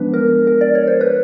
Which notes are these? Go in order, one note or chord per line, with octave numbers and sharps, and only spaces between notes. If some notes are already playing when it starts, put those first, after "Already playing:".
Already playing: F3 G#3 B3 D4 B4
A#4
A#4
D5
C#5
C5
B4